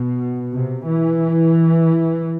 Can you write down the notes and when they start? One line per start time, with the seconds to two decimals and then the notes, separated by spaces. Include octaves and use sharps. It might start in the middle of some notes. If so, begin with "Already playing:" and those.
Already playing: B2
0.53 C3
0.87 E3